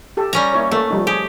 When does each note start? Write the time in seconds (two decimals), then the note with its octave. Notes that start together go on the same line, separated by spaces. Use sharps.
0.17 G4 A4
0.33 G3 C#4 A#5
0.53 A#3 E4 C#5
0.71 A3 A#3
0.90 F3 G3 D#4
1.07 G4 G#4